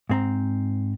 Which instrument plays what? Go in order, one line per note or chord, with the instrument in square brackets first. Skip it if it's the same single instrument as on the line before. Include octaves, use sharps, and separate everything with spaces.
[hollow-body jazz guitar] G#2 C4 A#5